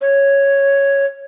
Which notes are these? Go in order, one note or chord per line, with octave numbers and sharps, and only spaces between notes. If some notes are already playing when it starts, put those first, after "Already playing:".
C#5